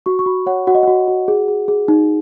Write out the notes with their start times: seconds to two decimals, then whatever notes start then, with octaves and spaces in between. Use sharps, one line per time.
0.06 F#4 C#6
0.19 C#6
0.26 F#4 B5
0.46 C#5 F#5
0.67 F#4 F#5
0.75 D#5
0.83 F#4 F#5
1.08 F#4
1.28 G#4
1.48 G#4
1.68 G#4
1.88 D#4